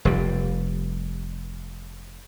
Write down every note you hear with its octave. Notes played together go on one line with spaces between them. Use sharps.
F1 G3